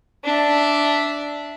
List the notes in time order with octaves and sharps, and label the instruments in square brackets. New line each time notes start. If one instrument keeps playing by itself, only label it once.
[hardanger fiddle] D4 E5